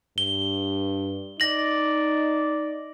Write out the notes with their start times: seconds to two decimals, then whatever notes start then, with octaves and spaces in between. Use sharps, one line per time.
0.18 G2 G7
1.40 D#4 D5 A#6 F#7